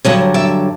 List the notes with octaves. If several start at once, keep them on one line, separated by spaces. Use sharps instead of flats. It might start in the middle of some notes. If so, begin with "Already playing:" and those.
G2 D3 F#3 C#5 D#5
D5 E5